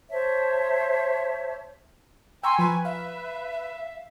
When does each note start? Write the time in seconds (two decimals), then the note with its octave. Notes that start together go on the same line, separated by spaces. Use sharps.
0.10 C5 C#5 E5 A5
2.43 G5 G#5 A#5 C6 C#6 E6
2.59 F3 B4 G#5
2.85 E5 F5